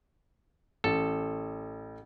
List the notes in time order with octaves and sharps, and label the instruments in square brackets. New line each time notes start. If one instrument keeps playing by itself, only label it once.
[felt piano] A1 [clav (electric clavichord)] A4